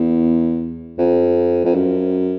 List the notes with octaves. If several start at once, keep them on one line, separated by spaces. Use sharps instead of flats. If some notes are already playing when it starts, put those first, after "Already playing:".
Already playing: E2
F2
F2
F#2